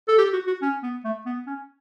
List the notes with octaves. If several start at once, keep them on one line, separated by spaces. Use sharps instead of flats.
A4
G4
F#4
F#4
C#4
B3
A3
B3
C#4